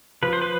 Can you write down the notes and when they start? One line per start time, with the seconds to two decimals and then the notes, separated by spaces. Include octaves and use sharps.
0.23 F3 B4
0.33 C5
0.42 B4